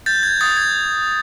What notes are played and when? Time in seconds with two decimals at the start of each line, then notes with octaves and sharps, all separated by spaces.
0.06 G6 A6
0.23 G#6
0.41 D#6 A6
0.57 G#6